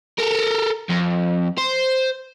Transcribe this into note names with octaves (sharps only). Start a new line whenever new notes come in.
A4 A#4
F2
C5